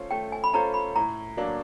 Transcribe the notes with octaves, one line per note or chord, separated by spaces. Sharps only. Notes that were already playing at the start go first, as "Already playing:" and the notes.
Already playing: A3 C#4 F4 A4 C5
A3 G5
G#5
B5
C#4 F4 A4 C5 A#5
B5
A2 A#5
F#3 A#3 D4